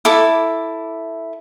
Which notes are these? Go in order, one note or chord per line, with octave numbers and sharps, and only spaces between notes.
E4 A4 D6